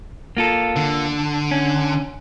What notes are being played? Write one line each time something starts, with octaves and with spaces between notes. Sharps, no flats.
A#3 F4 A4
D3
C#4